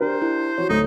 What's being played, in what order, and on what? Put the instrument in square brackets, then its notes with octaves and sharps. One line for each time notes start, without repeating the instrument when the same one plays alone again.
[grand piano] D4 G4 A#4 [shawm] C5
[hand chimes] E4
[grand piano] E3 F#4 [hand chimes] C#5
[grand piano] D1 A3 D#6 [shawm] D#4